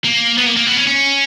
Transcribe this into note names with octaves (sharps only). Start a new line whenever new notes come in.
A#3
B3
A#3
A#3
B3
C#4
C#4